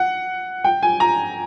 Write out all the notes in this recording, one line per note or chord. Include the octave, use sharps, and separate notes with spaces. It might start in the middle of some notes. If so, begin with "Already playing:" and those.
Already playing: F#5
G5
G#5
A#5